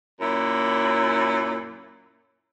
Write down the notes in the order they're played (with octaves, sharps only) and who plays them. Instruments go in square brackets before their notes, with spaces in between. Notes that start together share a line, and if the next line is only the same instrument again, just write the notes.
[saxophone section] F#2 A#2 E4